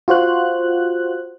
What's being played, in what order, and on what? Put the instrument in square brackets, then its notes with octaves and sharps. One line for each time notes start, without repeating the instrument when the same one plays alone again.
[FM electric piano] F4 F#4 C5 F#6